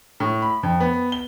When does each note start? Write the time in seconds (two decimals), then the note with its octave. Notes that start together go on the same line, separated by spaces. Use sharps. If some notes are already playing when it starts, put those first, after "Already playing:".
0.20 A2
0.42 B5
0.63 F2
0.80 B3
1.12 G7